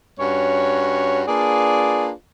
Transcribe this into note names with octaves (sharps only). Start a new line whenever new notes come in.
G2 C#4 F#4 C#5
A#3 D4 F4 G#4 B4 D5